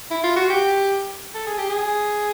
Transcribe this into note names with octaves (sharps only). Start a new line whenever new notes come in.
E4
F4
F#4
G4
A4
G#4
G4
G#4